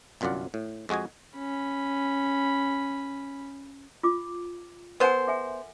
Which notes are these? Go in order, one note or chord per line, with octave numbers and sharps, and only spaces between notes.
G1 C2 F#2 F4 D5 F#5
A2
F2 G#3 F#4 D#5 G#5
C#4 B5
F4 D6
B3 A#4 C5 F#5 G#5
A4 E5 G#5